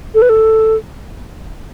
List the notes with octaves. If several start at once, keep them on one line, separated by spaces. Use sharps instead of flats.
A4
B4
A4